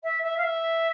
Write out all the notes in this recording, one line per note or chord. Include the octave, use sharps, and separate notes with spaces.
E5
E5
F5
E5